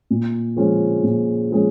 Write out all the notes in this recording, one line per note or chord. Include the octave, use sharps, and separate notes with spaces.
A#2
F3 G#3 C#4
A#2
F3 G#3 C#4